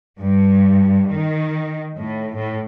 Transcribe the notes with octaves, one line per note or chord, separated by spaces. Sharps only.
G2
D#3
A2
A2